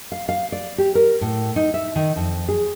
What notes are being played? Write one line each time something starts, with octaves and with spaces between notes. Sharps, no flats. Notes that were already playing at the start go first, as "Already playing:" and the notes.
F5
F5
D5
G4
A#4
A2
D#4
E5
D#3
F2
G#4